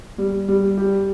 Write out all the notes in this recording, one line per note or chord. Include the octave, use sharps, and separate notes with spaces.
G3
G3
G4